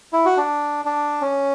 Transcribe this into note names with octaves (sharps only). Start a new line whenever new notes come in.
E4
F#4
D4
D4
C#4